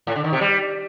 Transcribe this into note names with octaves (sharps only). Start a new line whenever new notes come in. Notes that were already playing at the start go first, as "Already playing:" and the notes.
A2
D3
D#3
C3
G3